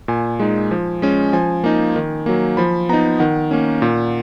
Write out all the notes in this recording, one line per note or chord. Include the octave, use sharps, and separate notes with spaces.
A#2 G#5
G#3 D#4
F3
G#3 C#4
F3 G#5
A#3 D#4
D#3
F#3 A#3
F3 B5
B3 D#4 A#5
D#3 F#5
A#3 C#4
A#2